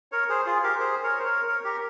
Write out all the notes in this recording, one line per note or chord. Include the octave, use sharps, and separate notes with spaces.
A#4 C#5
G#4 C5
F4 G#4
G4 A#4
G#4 C5
A#4 C#5
C5
A#4 C#5
A#4 C#5
G4 A#4